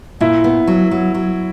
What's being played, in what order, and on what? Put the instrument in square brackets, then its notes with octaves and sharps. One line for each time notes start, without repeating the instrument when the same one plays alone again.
[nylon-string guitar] A#2 [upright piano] E4
[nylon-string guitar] B3
F#3
F#3
F#3